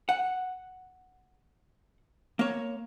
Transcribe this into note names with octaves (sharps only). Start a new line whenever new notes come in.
F#5
A#3 C#5